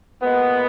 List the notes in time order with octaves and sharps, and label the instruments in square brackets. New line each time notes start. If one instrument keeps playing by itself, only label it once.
[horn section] A#2 G#3 B3